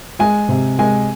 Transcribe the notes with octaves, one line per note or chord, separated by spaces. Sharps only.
G#3 G#5
C3
G#3 G#5